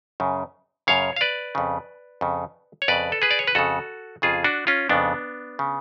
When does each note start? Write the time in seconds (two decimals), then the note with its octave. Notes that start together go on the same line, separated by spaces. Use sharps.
0.20 F#2 C#3
0.87 F#2 C#3 C#5 F5
1.16 F5
1.21 B4 D5
1.55 F2 C#3
2.21 F2 C#3
2.82 C#5
2.88 F2 C#3 B4 D5
3.12 A4
3.22 G#4 B4
3.31 D5
3.39 C#5
3.47 B4
3.55 F2 C#3 F#4 A4
4.22 F2 C#3 F4 G#4
4.44 D4 F#4
4.67 C#4 F4
4.89 F2 C#3 B3 D4
5.59 C#3